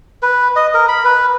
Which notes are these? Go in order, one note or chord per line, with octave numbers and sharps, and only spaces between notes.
B4
D#5
A#4
B5
B4